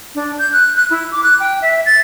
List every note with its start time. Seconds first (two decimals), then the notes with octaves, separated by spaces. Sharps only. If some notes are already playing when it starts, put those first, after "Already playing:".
0.15 D4
0.39 G6
0.53 F#6
0.76 F#6
0.91 E4
1.12 D6
1.23 F#6
1.40 G5
1.62 E5
1.86 A6